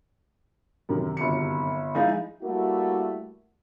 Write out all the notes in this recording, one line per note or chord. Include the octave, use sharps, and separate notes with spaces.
F#2 C3 D#3
G1 C#7
F3 G#3 D#4 E4
G3 A3 A#3 E4 F#4